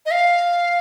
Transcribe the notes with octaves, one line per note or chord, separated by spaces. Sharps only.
D#5
F5